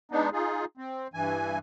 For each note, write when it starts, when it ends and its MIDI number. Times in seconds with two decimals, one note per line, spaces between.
0.12 0.30 56
0.12 0.30 59
0.12 0.30 62
0.12 0.30 63
0.33 0.65 63
0.33 0.65 65
0.33 0.65 68
0.78 1.08 60
1.14 1.58 43
1.14 1.58 52
1.14 1.58 80